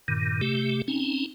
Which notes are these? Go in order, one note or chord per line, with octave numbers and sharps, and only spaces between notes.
G2 A#2 D#3
C3 A3 G4
C4 C#4 D#4